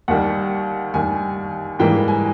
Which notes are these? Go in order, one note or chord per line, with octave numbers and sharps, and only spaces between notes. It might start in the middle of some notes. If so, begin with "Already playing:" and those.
D#2 D#3 G3 F#5
D#2 D#3 G3 G#5
G#2 E3 G3 A#3 G5
G#5